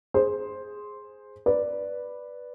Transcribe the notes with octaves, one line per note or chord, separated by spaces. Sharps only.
G#4 C5
B4 D5